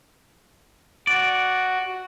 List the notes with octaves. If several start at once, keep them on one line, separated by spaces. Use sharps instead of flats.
F#4 D5